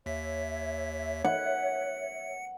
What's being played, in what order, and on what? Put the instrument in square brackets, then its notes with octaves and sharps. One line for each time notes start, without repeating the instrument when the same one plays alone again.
[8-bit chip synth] D#2 B6 [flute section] C#5 E5
[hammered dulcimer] F#5 [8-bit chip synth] C#7